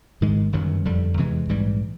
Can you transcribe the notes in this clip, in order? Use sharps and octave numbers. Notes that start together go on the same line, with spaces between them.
G#1 G#2 D#3 G#3
G1 F#2 D#3 F#3
G1 F2 D3 G3
E2 C3 E3 G#3
A#1 G#2 E3 G3